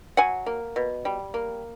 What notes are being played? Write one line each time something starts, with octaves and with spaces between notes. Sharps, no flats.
F#3 F#5 G#5
A#3
B2
G3
A#3